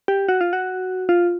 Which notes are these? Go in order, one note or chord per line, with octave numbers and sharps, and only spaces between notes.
G4
F#4
F4
F#4
F4